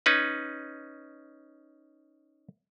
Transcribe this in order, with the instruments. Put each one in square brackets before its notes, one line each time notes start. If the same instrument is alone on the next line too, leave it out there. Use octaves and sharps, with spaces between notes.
[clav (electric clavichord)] C#4 D#4 B4